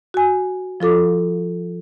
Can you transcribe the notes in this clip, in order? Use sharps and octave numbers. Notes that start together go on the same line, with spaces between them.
F#4 G#5
F3 F4 A4 D6